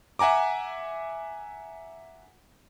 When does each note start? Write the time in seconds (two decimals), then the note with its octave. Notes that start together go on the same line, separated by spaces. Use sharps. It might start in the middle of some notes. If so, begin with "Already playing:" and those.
0.19 E5 F#5 G#5 A#5 D6